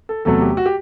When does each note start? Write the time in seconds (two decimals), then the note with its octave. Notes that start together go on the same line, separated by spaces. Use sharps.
0.09 A4
0.25 E2 C3 F#3 A3 A4
0.41 G4
0.57 F#4
0.66 G4